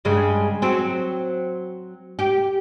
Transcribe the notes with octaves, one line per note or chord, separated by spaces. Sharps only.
G2 C#3 G#3
F#3 C4
G4